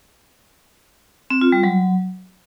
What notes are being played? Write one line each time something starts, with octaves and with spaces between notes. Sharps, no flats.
C4
F4
G3
F#3